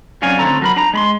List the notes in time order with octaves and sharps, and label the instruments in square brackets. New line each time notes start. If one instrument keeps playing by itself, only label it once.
[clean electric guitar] F2 F#3 C#4 D5 F5 G#5
A2 D3 C4 A4 A#5
F#3 A#4 B5
D4 A#5
G#3 B5 C6